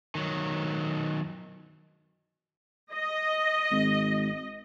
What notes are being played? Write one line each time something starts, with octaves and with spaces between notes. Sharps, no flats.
D#3 F#3
D#5
G#1